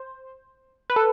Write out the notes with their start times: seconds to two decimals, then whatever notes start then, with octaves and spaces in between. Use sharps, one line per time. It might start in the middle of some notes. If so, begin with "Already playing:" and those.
Already playing: C5
0.90 B4
0.96 A4